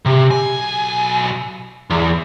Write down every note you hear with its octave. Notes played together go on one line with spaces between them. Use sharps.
C3
B1 G#5
E2